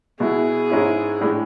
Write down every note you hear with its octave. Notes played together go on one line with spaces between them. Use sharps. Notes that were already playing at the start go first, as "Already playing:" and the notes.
B2 G#3 B3 E4 G#4
G#2 G#3 C#4 E4
A2 G#3 D4